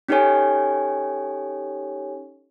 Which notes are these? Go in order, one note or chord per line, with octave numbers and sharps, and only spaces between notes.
C#4 D#4 G4 A4 C#5 G#5